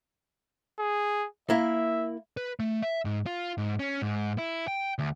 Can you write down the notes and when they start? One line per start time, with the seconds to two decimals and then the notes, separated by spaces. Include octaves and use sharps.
0.79 G#4
1.50 A#3 E4 E5
2.37 B4
2.60 A3
2.82 E5
3.05 G#2
3.26 F4
3.58 G#2
3.79 C#4
4.02 G#2
4.38 E4
4.68 G5
4.99 D2